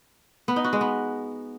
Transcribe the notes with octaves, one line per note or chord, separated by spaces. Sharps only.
B3
D#4
F#4
G#3
B3